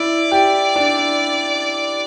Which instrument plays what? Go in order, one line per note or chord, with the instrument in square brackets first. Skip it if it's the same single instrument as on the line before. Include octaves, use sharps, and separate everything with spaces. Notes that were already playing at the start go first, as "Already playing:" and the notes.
Already playing: [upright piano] E4 [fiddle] D5
[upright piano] G4
D4